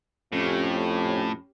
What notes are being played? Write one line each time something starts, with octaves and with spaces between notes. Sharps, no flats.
F2 A2 C#4 G4